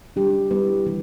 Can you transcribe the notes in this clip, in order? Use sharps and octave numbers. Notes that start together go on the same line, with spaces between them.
G3 D4 G4
G3 B3 E4 B4
E3 G3 B3